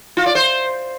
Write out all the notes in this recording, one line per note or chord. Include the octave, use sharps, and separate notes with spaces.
F4
D5
C5